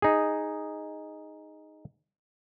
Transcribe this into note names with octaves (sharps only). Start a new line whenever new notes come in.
D#4 G#4